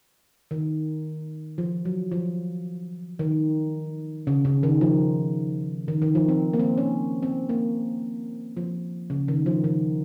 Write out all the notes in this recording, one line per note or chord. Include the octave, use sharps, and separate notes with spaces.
D#3
F3
F#3
F3
D#3
C#3
C#3
D#3
F3
D#3
D#3
F3
C4
A#3
C4
C#4
C4
A#3
F3
C#3
D#3
F3
D#3